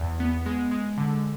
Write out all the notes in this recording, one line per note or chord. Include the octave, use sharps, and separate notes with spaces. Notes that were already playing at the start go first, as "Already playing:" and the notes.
Already playing: E2
B3
G#3
G#3
D3